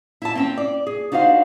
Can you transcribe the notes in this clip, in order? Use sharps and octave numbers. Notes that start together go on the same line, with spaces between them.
E4 E5 A5
C4 C#4 G5
D5
G#4
D4 D#4 F#4 C5 F5